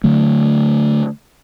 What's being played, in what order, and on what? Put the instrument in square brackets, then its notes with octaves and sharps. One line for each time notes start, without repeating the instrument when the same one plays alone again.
[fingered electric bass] D3 F#3 A3